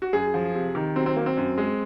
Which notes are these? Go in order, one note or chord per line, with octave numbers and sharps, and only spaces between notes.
F#4
F#2 G#4
F3
C3
D#3
F#3 C4
C4
F#3 A#3
C4
F#2
G#3